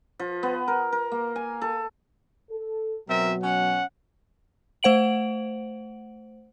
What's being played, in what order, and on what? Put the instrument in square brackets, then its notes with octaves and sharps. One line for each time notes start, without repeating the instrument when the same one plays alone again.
[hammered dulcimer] F3
B3
A#4
A#4
A#3
G#5
A4
[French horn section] A4
[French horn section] B2 F#3 [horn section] C4 A#4 E5
[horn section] C#4 F#5
[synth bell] A3 C5 F#5 D7 F#7